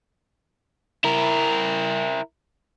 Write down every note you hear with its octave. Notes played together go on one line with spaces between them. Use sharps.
E4 A#4